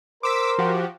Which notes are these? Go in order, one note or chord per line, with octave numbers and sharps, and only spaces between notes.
A#4 C5 D6 E6 B6
F3 F#4 G4